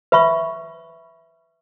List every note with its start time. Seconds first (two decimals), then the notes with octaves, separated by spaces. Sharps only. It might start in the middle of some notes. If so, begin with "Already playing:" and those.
0.12 B4 E5 B5 C#6